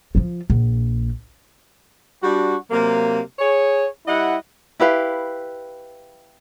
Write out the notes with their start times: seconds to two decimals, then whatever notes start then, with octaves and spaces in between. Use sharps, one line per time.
0.15 F3 F4
0.50 A#1
2.23 G3 D4 F#4
2.70 C3 F#3 A#3
3.39 G#4 C#5
4.07 G3 E4 D#5 F#5
4.80 E4 G4 B4 F5